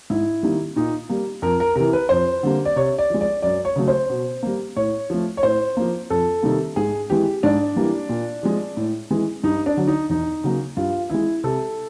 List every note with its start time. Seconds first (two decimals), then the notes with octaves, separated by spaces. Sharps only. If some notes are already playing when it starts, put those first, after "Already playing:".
0.10 G#2 E4
0.43 D#3 G3 A#3
0.76 A#2 D#4
1.09 G3 A#3
1.42 F2 A#4
1.60 A#4
1.76 C3 E3 A#4
1.93 B4
2.09 F2 C5
2.43 D3 G3 A#3
2.65 D5
2.76 C3 C#5
2.98 D5
3.10 F3 G#3
3.21 D5
3.42 F#2 D5
3.65 C#5
3.76 C#3 F#3 A3
3.88 C5
4.10 B2
4.43 G3 A#3
4.76 A2 C#5
5.10 F3 A3
5.37 C#5
5.43 A2 C5
5.77 F3 A#3
6.10 F2 A4
6.43 C3 D#3 G3 A#3
6.76 G#2 G#4
7.10 E3 G#3 G4
7.43 G#2 D4
7.76 E3 G3 A#3
8.09 A#2
8.43 F3 G#3
8.77 A2
9.11 E3 G#3
9.44 G2 D#4
9.66 D4
9.77 D3 F#3
9.87 D#4
10.10 E2 D#4
10.44 C#3 F#3 A#3
10.77 G2 F4
11.10 E3 G#3 E4
11.44 C3 A4